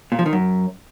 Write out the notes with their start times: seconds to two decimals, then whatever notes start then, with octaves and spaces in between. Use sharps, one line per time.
0.12 A#2
0.19 F3
0.26 D#3
0.33 F#2